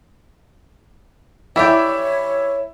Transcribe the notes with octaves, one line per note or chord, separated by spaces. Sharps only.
E3 D4 E4 G4 C#5 E5